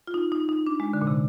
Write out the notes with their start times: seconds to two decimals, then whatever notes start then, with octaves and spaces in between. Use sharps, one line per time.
0.07 F4
0.14 D#4
0.32 D#4
0.49 D#4
0.67 D4
0.80 G#3
0.93 D3
1.01 A#2
1.07 C3